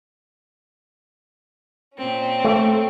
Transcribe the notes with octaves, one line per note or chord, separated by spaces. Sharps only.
A#2 C4 C#4
A3